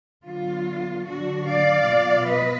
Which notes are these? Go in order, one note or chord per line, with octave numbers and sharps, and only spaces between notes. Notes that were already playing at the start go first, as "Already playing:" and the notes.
D3 F#3 B3 F4
D3 F#3 D4 F#4
D5 F5
B2 F#3 B3 F4
B4 D#5